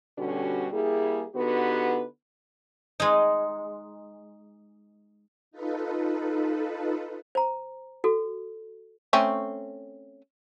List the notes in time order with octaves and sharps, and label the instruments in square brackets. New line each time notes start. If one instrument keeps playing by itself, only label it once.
[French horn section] B2 D3 G3 C#4 F#4 G4
G3 A#3 E4 G#4
D3 B3 D#4 F#4 G4 B4
[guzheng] G#3 D#4
[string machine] D#4 F4 A4 B4
[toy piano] C5 A#5
F#4 A4
[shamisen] A3 C4 C#4